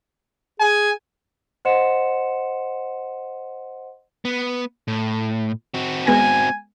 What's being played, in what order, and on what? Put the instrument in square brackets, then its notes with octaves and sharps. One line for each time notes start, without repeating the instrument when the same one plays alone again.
[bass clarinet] G#4 [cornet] G#5
[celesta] C5 D#5 F#5 C6 C#7 E7
[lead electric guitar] B3
A2
C4 F#4
[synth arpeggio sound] G#3 B3 A#6 [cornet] G#5